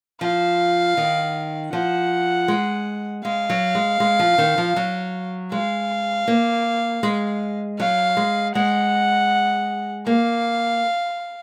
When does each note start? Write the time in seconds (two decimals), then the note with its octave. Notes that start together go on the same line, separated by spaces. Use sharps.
0.21 F3 F5
0.97 D#3
1.73 F3 F#5
2.48 G#3
3.25 G#3 F5
3.50 F#3
3.75 G#3
4.00 G#3
4.19 F3
4.38 D#3
4.58 F3
4.76 F#3
5.52 G#3 F5
6.28 A#3
7.03 G#3
7.79 F#3 F5
8.17 G#3
8.55 G#3 F#5
10.07 A#3 F5